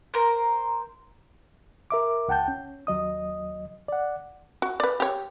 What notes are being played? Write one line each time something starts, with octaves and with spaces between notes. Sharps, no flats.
A#4 C5
A#4 E5 D6
C#2 F#5 G5 A5 G6
C#4
D#2 F#3 D#5 D#6
D5 F#5
F#4
B4 D5
G4 C#5